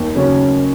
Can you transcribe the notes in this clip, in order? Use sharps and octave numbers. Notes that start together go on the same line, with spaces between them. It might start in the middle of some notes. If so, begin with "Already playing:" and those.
Already playing: D#2
C#3 F#3 C#4